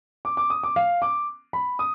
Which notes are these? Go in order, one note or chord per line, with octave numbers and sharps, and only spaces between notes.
D6
D6
D#6
D6
F5
D6
B5
D#6